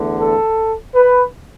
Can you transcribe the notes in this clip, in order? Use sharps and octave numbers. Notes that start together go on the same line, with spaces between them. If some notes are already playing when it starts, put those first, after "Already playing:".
Already playing: E2 D3 A3
A4
B4